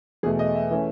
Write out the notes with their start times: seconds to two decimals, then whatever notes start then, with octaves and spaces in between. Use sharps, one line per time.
0.23 E2 B2 A3 G#4
0.39 D#5
0.55 E5
0.71 E3 A3 C#4